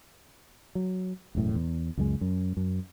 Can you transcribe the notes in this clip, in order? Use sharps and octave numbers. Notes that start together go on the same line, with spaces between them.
F#3
E1 F#2 A2
E2
C#2 F#2 G3 G#3
F#2
F#2